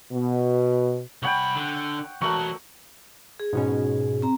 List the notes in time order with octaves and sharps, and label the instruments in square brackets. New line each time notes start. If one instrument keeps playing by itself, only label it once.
[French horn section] B2
[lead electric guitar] C2 B5 [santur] C#5 F#5 G5
[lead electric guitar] D3
[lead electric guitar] E3 F#4 [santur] A3 A#4 C#6
[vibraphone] G#4
[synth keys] G#2 B2 C#4
[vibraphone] C4 A#5